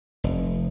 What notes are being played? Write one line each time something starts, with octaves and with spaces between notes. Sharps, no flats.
F1